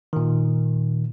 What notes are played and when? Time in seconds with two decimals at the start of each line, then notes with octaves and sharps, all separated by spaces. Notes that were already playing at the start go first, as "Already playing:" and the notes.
0.13 A#2 D#3